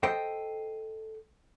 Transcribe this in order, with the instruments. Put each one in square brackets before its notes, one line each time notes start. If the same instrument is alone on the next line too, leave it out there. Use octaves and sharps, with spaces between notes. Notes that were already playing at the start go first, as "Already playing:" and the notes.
[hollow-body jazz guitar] A4 C5 D#5 G5